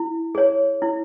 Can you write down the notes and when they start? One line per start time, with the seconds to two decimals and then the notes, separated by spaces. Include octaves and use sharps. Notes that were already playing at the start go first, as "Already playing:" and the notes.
Already playing: E4
0.35 G#4 C#5
0.82 E4